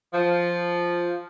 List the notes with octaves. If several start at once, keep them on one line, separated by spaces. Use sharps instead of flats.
F3